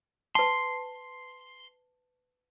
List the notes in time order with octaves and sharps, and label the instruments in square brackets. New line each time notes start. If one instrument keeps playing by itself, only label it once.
[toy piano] B4 A5 [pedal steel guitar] C6